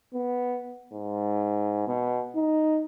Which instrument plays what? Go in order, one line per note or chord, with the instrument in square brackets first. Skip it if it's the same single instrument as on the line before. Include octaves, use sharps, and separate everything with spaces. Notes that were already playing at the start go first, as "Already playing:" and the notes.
[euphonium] B3
G#2
B2
D#4